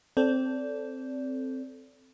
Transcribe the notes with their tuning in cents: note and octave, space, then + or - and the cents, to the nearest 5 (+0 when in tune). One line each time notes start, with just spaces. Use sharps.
C4 +0 A4 +0 D5 -25